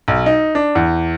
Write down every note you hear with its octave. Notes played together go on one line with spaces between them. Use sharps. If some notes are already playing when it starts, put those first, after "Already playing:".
B1
D#4
D4
E2